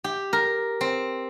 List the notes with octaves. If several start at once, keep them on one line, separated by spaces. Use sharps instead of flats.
G4
A#4
C4